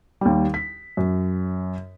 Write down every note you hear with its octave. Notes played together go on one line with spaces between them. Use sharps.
D#2 G3
B6
F#2